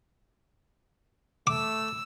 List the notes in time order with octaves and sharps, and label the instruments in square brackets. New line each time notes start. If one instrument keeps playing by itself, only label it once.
[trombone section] A3 [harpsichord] D6 [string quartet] E6